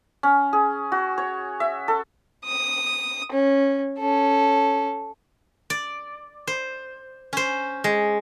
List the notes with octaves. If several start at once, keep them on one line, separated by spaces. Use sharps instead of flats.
C#4
G#4
F#4
C#5
E5
A4
D#6
C#4
C#4 A4
D5
C5
C#4 C5
G#3